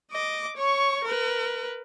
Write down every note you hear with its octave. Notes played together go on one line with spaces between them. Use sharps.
D#5 D6
C#5 C#6
A#4 B4